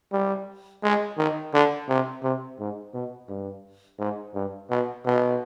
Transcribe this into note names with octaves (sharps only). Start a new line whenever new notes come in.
G3
G#3
D#3
D3
C3
C3
G#2
B2
G2
G#2
G2
B2
B2